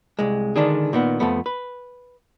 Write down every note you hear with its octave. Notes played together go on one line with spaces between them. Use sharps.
C2 G#3
D3 D#3 G#3 D4 G#4
A#2 D#3 B3
F2 F3 A3 B3
B4